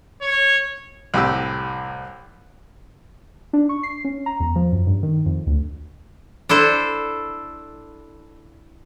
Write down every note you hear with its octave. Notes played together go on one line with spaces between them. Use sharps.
C#5
C2 A2 G4 E6
D4
C#6
C7
C#4
A#5
E2
F3
F#2
G2
D#3
F2
D2
D4 E4 A4 C5